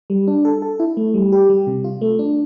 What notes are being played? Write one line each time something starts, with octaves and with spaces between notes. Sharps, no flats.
G3
D4
A4
A4
E4
A3
G3
G4
G3
C3
F4
A3
D4